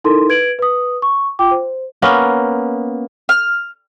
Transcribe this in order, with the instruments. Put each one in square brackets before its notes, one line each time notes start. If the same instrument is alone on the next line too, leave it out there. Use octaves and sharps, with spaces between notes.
[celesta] D#4 E4 A4 A#4 C6
B4 G#6 D7 F#7
B4 D#6
C#6
F4 G5 D6
C5
[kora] A#3 B3 C#4
[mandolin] F6